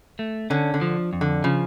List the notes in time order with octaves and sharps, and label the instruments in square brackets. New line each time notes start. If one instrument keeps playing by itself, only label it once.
[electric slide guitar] A3
[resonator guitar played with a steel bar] D3 [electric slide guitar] C#4
[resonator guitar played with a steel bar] D3
[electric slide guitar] F3
F2
[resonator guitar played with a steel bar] D3
[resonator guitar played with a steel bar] C#3 [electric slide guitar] F3